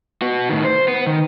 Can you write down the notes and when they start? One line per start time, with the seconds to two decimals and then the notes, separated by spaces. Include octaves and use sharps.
0.22 B3 F#4
0.49 A2 D#3
0.64 C5
0.88 B3
1.07 D#3